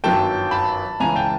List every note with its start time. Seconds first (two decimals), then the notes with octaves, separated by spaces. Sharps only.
0.04 G1 F#2 D#3 F#3 G5 A5
0.51 A5 B5
1.00 C#2 C#3 E3 G#5 A#5
1.16 G5 A5